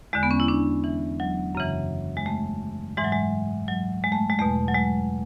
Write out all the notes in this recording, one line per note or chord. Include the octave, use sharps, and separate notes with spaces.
E2 D3 G#3
B3
C#4
E4
D4
E3
F#3
F#2 C#3 E3
G#3
A3
G#2 E3 G#3
F#3
G#3
F#3
G#3
A3
G#3
E2 B2 A3
F#3
G#3